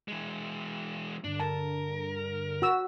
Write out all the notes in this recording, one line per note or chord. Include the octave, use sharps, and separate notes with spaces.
E3 G#3
G2 D3 D4
A#4 A5
F#4 E6